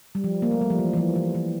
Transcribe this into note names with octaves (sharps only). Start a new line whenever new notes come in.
G3
F3
A#3
A3
G3
F3
E3
E3
F3
E3
E3